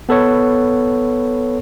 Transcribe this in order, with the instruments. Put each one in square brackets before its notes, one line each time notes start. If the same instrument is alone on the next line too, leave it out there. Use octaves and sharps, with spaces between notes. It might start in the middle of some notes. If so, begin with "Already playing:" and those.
[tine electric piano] B3 A4 B4 C#5